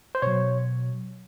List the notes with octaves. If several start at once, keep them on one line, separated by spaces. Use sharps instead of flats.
C5
B2 F#3 C#5